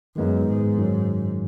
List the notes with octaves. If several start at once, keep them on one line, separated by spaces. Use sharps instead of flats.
F#2 D#3 G#3 B3 D#4
G#2
F#2 D#3 F#3